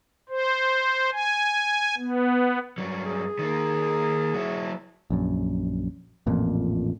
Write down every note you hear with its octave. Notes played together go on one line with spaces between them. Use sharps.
C5
G#5
B3
G2 F#3
G#4
D#3 A#3
F#3 E4
A#1 F#2
A1 F2 A#2